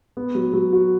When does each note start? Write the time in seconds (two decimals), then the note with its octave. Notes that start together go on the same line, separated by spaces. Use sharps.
0.17 B3
0.35 F#3
0.53 F#3
0.73 F#4